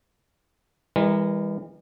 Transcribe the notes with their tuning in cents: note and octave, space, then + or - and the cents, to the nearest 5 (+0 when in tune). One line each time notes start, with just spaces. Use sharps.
E3 -5 G#3 -45 A#4 +0